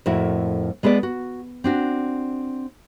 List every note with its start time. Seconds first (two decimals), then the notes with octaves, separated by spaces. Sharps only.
0.06 F2 A2 A#3 E4 F#4
0.83 G#3 B3 G#4 B4 D5
1.03 F#4
1.64 C4 D4 F#4